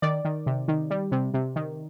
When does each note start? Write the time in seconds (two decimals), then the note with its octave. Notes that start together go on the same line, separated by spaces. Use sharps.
0.02 D#3 D5
0.25 D#3
0.46 C3
0.68 D#3
0.90 G3
1.12 C3
1.34 C3
1.56 D#3